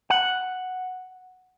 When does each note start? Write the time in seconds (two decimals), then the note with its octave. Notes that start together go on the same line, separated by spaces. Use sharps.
0.10 F#5